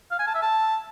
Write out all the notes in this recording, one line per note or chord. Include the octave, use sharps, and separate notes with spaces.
F5
G#5
A5
E5
A5